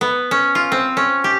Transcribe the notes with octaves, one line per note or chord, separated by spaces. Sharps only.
B3
C#4
F4
C4
C#4
G4